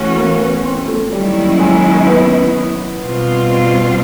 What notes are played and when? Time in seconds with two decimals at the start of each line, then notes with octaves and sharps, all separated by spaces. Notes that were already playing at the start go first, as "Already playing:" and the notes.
Already playing: E3 A3 C#4 F#4
0.17 A#3
0.41 B3
0.64 C4
0.88 A3
1.11 D#3 F#3 G3 A#3 C#4 E4
1.59 G#3
2.07 B3
3.01 B2 G3 C4 F4